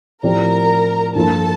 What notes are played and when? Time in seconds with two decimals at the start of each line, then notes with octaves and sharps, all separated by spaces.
0.23 A2 F3 C4 G4 A#4 D5 A#5
1.15 G2 F3 A#3 F4 A4 A#4 A5